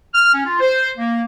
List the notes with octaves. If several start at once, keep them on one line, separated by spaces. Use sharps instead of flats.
F6
C#4
F4
C5
A#3